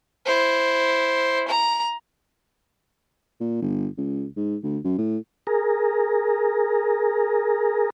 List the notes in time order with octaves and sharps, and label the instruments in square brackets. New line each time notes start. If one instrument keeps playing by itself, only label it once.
[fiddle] E4 C5
A#5
[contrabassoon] A#2
G1
C#2
G#2
D2
F#2
A2
[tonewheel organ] G#4 A#4